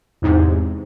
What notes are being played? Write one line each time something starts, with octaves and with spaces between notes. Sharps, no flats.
E2 G#2 C3